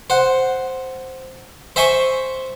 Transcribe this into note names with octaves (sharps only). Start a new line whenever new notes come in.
C5 F#5
C5 E5 G#5 C6 C#6